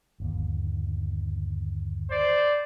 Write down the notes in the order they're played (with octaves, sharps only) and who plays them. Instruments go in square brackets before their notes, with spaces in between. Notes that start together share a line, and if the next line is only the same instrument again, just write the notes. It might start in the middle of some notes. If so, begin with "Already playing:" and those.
[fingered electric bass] G1 D#2
[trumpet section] C5 D5